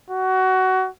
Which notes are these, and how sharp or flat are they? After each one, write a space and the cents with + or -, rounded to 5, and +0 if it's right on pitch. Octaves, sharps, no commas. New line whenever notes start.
F#4 +20